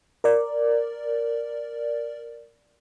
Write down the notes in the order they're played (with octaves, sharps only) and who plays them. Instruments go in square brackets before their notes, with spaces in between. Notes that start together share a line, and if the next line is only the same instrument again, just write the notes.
[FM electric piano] A#4 D5